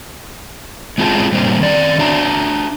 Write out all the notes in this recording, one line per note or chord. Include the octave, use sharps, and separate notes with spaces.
G#3 C4 E4 F4 G#4 A5
A#2 G3 A#3 D4 C5
D#3 C4 D5
D4 F#4 E5 A5 A#5